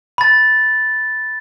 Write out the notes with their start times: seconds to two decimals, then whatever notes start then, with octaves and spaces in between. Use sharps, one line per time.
0.18 B5 A6